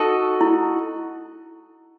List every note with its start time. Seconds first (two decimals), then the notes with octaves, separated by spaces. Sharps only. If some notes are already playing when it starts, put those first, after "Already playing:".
Already playing: D#4 F#4 A4 D#5
0.41 E4